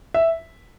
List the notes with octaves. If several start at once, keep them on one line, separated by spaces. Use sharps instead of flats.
E5